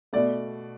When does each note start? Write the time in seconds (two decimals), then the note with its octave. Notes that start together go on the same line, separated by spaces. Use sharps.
0.13 B2 A3 D5